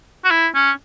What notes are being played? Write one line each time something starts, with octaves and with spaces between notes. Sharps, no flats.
F#4
E4
C#4